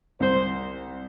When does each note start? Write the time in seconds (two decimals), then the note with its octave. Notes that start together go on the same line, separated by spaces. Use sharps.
0.20 C2 C5